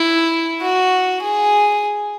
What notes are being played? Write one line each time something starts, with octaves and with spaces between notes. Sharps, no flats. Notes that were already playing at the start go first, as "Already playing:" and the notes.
Already playing: E4
F#4
G#4